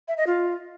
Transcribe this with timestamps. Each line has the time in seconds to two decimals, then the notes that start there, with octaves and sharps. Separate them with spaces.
0.08 E5
0.17 D#5
0.27 F4